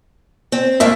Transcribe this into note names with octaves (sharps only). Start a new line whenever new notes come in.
C4
G#2 A3 A#3 E5